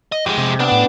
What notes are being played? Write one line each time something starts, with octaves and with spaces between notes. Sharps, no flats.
D#5
F2 G#3 G4
C3
B3 D4 D5
A2